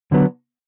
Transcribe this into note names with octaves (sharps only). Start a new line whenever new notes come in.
D3 F#3 B3